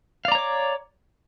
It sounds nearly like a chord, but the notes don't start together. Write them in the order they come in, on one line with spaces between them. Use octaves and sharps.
F5 D5 A#5 C#5 D6